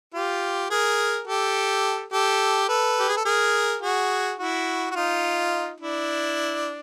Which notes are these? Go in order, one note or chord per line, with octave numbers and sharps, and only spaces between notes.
F4 G4
G#4 A#4
G4 A4
G4 A4
A4 B4
G4
G#4
A4
G#4 A#4
F#4 G#4
E4 F#4
F#4
D#4 F4
D4 E4